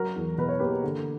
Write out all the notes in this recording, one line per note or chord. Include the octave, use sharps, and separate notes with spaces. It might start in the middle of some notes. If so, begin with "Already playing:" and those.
Already playing: F#3 F#4 A#4
E2
B2 B4
C#5
A#3 G4 B4
D3